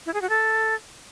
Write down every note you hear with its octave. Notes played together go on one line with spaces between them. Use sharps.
E4
G#4
F#4
A4